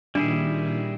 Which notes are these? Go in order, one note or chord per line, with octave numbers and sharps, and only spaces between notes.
A#2 D#3 G3 D4 E4 G#4